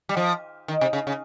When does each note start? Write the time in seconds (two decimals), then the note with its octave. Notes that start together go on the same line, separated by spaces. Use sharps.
0.09 G3
0.17 F3
0.68 D#3
0.81 C3
0.93 C#3
1.07 C#3